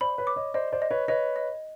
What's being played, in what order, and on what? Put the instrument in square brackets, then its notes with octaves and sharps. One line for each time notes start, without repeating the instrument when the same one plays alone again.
[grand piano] C5 D5 [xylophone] B5
[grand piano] B4 C#5
[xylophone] D6
[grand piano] C#5 D#5
[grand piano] C5 D5 [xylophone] D#5
[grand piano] C5 D5
[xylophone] D#5
[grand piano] B4 C#5
[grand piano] B4 C#5 [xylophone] D#5
[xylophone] D#5